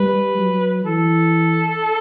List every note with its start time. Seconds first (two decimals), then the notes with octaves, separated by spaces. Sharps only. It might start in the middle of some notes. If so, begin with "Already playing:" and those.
Already playing: G3 B4
0.38 F#3
0.85 E3 A4